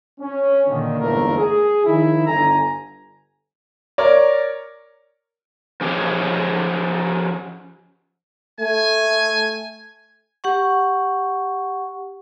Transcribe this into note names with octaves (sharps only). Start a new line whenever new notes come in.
C#4
A#2 D3 D#3
G1 E2 G#2 A3 A#3 A#4
G#4
D#3 F3 D#4 E4
G1 D3 A4 G#5 A#5
A#4 C#5 D5
F3 C#4 D#4 G4 G#4 C#5
A3 G#5
G4 F#5 C#6